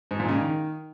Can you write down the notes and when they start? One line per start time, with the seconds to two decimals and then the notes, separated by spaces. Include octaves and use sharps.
0.11 G#2
0.20 A#2
0.28 C#3
0.37 D#3